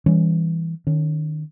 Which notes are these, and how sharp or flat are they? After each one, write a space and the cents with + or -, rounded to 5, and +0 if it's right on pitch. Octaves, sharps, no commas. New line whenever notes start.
E3 +0 G3 +25 C#4 +0
D#3 -20 C#4 +0